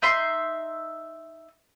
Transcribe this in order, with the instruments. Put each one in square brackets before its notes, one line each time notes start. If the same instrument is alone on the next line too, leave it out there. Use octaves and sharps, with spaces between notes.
[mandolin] D#4 E5 C6